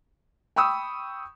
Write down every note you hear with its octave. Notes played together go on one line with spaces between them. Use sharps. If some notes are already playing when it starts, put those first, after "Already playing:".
G5 B5 C#6 D#6 E6